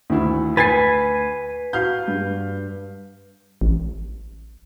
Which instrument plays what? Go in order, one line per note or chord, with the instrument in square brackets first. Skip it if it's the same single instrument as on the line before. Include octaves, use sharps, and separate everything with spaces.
[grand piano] D2 [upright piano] D#3 E4
[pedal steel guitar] B4 G#5 [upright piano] A6 B6 C7
[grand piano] F#4 [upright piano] F5 F6 G6
[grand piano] G2
[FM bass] A1